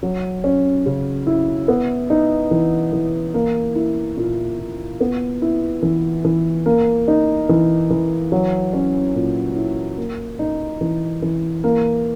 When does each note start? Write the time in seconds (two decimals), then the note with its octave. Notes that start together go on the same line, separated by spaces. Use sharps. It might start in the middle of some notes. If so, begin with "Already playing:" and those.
0.03 F#3
0.44 C#4
0.86 C#3
1.27 E4
1.68 B3
2.10 D#4
2.51 E3
2.93 E3
3.34 A#3
3.76 E4
4.17 A#2
4.58 A#2
5.00 B3
5.42 E4
5.82 E3
6.25 E3
6.66 A#3
7.08 D#4
7.49 E3
7.90 E3
8.32 F#3
8.73 C#4
9.15 A#2
9.56 E4
9.98 A#3
10.39 D#4
10.81 E3
11.22 E3
11.64 A#3